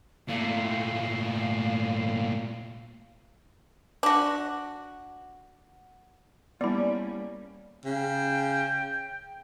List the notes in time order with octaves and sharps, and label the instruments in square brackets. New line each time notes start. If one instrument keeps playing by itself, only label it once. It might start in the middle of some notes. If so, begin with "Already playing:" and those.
[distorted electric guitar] A#2 A3 [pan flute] F5
[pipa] D4 F#4
[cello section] G3 A#3 C#4 [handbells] B3 E4 [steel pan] D5
[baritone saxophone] C#3 [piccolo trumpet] G5